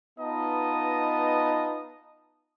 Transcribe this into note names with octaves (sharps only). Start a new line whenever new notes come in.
B3 D#4 F4 B4 D#5 A5